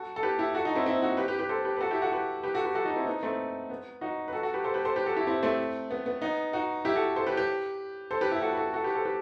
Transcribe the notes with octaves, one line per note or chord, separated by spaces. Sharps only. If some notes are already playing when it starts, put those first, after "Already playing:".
Already playing: F#4 A4
A4
G4 B4
E4 G4
F#4 A4
D#4 F#4
C4 E4
C4 E4
D#4 F#4
G4 B4
G4 B4
G4 B4
A4 C5
G4 B4
B4
F#4 A4
E4 G4
F#4 A4
G4 B4
G4 B4
F#4 A4
G4 B4
F#4 A4
D#4 F#4
C4 E4
B3 D#4
A3 C4
B3
D#4 F#4
B4
F#4 A4
F#4 A4
G4 B4
A4 C5
G4 B4
A4 C5
G4 B4
F#4 A4
E4 G4
C4 E4
A3 C4
B3
B3
B3 D#4
D#4 F#4
E4 G4
F#4 A4
A4 C5
G4 B4
G4 B4
A4 C5
G4 B4
E4 G4
F#4 A4
B4
F#4 A4
F#4 A4
G4 B4
A4 C5
G4 B4